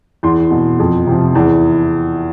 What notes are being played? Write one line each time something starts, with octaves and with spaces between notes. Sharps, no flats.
E2 C6
B2
F2
C3
F3
E2